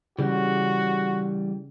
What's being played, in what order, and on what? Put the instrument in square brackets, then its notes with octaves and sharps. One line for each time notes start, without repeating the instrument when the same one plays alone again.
[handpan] C#3 [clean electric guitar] E3 G3 [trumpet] F#4